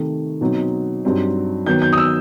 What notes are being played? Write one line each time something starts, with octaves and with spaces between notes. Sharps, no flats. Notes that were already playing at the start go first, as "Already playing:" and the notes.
Already playing: C3 D#3 A3
B2 F#3 C4 D#4
G2 F#3 C4 D#4
D#3 F#3 B3 G6
G6
D#6
E6